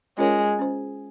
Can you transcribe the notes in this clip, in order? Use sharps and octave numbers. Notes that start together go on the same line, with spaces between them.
G#3 C#4 F4 A#4 C#5
C#4 G#4 C5